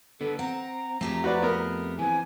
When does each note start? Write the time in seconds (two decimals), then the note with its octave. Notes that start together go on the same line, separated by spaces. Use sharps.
0.21 D3 B3 A4
0.39 C4 F#5 A#5
1.01 F2 A3 C4 G4 G#4
1.24 F#4 B4 D5
1.42 B3 A#4
1.99 E3 C4 G#5